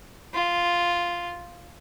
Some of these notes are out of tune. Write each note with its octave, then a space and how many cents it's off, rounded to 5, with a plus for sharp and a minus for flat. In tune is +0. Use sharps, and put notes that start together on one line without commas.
F4 -5